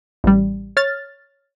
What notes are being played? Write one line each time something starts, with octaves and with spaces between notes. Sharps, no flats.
A1 G3
C#5 F6 A6